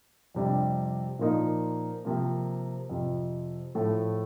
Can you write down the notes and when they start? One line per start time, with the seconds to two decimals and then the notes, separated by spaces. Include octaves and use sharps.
0.35 F2 C3 G3 D4
1.19 A#2 F3 A#3 D#4
2.05 C3 F3 A#3
2.90 F2 C3 F3
3.75 A2 F3 A3